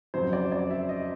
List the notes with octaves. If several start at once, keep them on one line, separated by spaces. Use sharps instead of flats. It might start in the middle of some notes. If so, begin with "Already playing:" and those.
F2 C#3 F#3 C5
D5
D5
E5
D#5